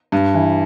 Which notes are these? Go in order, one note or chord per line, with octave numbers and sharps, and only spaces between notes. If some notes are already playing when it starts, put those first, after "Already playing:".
G2
E3